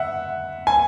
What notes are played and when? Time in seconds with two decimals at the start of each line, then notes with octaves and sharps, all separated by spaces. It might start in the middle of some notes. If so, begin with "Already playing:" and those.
Already playing: E5 F#5
0.67 G#5